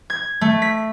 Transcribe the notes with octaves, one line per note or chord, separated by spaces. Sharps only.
G#6
A3
B6